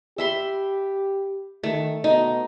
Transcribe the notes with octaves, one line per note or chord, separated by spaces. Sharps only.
G4 E5 B5 C6
D#3 A3
B2 D#4